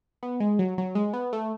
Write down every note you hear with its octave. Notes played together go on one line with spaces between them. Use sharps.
B3
G#3
F#3
F#3
G#3
B3
A3